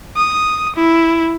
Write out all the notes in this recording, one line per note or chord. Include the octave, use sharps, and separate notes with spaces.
D#6
E4